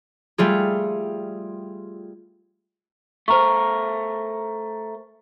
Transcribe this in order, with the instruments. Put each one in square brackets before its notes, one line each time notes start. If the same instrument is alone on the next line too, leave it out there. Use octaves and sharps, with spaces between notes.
[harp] G3 A3 F4 G#4
[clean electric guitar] A3 A#4 [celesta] C5 A#5 C#6